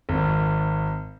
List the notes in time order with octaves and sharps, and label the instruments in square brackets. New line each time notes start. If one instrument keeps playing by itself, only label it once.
[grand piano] G#1